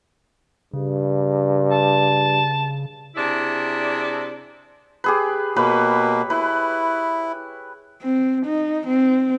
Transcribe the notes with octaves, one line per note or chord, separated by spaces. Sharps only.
G2 C#3
A5
C3 D4 E4 G#4 D5
G4 G#4 B4
B2 A#3 B4 C#5 B5
E4 B4
C4
D#4
C4